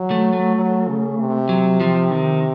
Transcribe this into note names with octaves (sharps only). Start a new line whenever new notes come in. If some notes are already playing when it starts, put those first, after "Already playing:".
Already playing: F#3
A3
A3
F#3
C#3
C3
F#3
F3
D#3